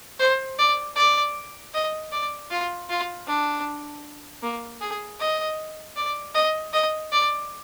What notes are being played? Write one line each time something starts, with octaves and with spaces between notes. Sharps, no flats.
C5
D5
D5
D#5
D5
F4
F4
D4
A#3
G#4
D#5
D5
D#5
D#5
D5